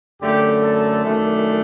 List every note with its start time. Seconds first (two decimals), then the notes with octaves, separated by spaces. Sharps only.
0.22 F#2 D3 A3 G4
0.62 A4
1.04 F#2 D#3 A3 D4